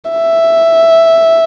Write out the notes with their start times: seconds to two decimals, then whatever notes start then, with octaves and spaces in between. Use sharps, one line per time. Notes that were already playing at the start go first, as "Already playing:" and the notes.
0.11 E5